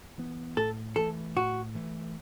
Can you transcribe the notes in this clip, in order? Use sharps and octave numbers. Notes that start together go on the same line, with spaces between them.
E3 B3
A2 A4
E3 A3 A4
A2 F#4
E3 A3